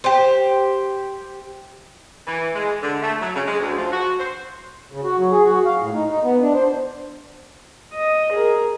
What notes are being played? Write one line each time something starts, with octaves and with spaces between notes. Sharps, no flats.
G4 C5
E3
G#3
D3
A3
F#3
C#3
G#3
D2
F3
F#4
C5
C#3
F#4
F#3
G#4
F#4
F5
A2
D#4
D#4
B3
D4
C5
D#5
G#4 A#4